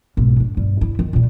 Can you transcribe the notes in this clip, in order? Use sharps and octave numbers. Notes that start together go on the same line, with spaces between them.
B1 G#2
D4
G2
E4
D#3
A#2 G3